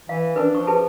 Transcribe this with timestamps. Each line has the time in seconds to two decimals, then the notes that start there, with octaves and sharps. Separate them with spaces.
0.09 E3 F5
0.36 C#4 D4 A#4 B4
0.55 F3 C#6
0.67 G#4 B4 A5